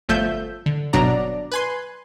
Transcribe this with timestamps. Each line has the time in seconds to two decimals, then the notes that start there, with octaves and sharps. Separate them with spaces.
0.09 G1 F3 A3 E5 G6
0.66 D3
0.93 G1 B2 F#3 D4 D5 A#5
1.51 B4 G#5 C6